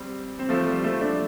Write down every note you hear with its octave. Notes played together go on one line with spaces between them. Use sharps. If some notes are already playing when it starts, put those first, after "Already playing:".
Already playing: G3 C4
C4
F3 A3
G3
F3 A3
A3 D4